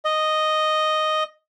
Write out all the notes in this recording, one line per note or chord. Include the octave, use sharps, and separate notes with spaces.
D#5